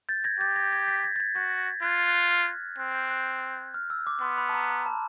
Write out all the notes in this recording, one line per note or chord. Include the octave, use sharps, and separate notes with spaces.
G6 A6
G#6 A#6
G4 G6 A6
G#6 A#6
G#6 A#6
A6 B6
G#6 A#6
A6
G#6 A#6
F#4 G#6 A#6
F4 F#6 G#6
F#6
F6
C4 F#6
G6
F#6
F6
E6
D6
B3 C6
B5
A5
A#5
A#5
A5